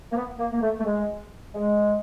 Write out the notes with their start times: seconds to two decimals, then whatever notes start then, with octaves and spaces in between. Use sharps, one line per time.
0.12 A#3
0.16 B3
0.39 A#3
0.52 A#3
0.62 A3
0.80 A3
0.85 G#3
1.54 G#3